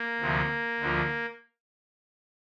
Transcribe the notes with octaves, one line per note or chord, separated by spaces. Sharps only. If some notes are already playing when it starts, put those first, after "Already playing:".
Already playing: A#3
D2 C3 F3
D2 D3 F3